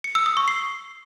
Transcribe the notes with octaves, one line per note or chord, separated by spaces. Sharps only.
C#7
E6
D#6
C#6
C7